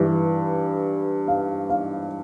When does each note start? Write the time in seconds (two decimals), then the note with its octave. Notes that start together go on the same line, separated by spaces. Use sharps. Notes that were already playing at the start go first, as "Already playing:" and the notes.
Already playing: G2 E3
1.28 F5
1.70 F5